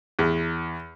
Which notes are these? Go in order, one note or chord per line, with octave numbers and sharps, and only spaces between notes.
E2